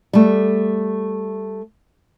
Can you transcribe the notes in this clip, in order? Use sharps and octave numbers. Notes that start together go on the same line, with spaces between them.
G3 A3